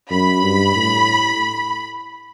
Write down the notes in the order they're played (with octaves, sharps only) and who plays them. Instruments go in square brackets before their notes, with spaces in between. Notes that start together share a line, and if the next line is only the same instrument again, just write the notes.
[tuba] F#2 [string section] B5
[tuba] G2
A2